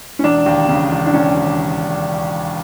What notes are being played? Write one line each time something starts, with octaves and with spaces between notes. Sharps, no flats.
C#4
E1 D4
D#2
C#3
E1
D4
E1 C#4
D#2